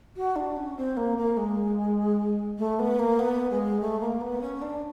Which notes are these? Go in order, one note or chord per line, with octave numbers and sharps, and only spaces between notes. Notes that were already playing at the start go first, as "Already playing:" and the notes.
F#4
D4
C#4
C4
A#3
A#3
G#3
A3
B3
A#3
B3
G#3
A3
A#3
B3
C#4
D4